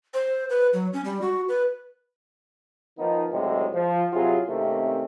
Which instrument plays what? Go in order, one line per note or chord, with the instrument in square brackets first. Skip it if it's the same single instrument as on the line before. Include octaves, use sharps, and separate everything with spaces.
[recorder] C5
B4
F#3
C#4
G3
F#4
B4
[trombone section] D#3 F3 A#3 B3 D#4
B1 E2 A2 C3 G#3
F3
C3 F#3 E4 F4 G#4
C3 D#3 A3 A#3 C4 C#4